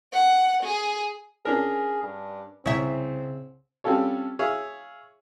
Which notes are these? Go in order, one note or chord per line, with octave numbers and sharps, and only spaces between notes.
F#5
G#4
C#4 D4 G#4 A#4
G2
C2 C#3 C4 E5
G3 C4 C#4 F4 A4 C#5
G#4 C#5 E5 F5